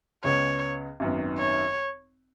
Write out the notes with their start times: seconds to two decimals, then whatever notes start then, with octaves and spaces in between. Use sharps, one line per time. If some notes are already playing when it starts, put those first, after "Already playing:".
0.24 C#2 C#3 B3 C#5
1.00 G#1 F#2 D#3 B3
1.38 C#5